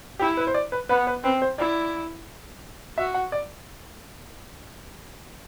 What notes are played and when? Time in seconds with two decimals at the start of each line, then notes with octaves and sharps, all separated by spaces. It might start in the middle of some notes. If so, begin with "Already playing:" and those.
0.19 E4 G4
0.37 B4
0.47 C5
0.54 D5
0.72 B4
0.89 B3 B4
1.07 B4
1.24 C4 B4
1.42 C5
1.58 E4 D5
2.98 F#4 E5
3.14 F#5
3.32 D5